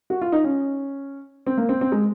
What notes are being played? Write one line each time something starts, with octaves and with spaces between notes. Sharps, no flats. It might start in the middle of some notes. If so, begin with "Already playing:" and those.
F#4
F4
D#4
C#4
C4
A#3
C4
C4
G#3